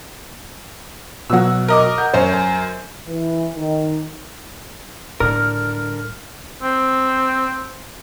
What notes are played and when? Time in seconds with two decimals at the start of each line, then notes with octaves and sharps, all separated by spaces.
1.30 B2 F#3 F#4 E6
1.68 A#4 D#5 D6
1.98 F#5 G6
2.14 F#2 C5 C#5
2.33 G#5
3.07 E3
3.56 D#3
5.20 A2 D3 G3 D4 A#4 F6
6.63 C4